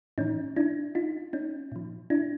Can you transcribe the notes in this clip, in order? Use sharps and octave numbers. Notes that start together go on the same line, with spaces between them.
A2 E3 C#4 D#4
D4 E4
D#4 F4
C#4 D#4
A#2 F3
D4 E4